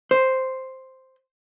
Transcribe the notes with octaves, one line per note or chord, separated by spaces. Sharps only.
C5